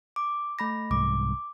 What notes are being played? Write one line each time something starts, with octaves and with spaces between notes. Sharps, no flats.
D6
A3 B5 A#6
C2 G#2 D6